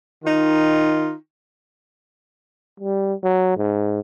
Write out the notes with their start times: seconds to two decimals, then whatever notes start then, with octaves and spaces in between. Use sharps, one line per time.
0.24 D#3 D#4 F4
2.80 G3
3.23 F#3
3.57 G#2